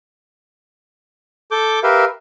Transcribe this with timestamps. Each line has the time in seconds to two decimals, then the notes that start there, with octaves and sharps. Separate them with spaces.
1.51 A4 D6 G6
1.83 G4 A#4 B4 E5 F5